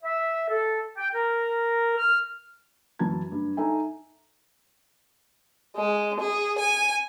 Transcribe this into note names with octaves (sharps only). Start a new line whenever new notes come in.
E5
A4
G5
A#4
F6
F#2 E3 F#3 A5 G#6
G2
D#4 A4 E5 G#5
G#3
G#4
G#5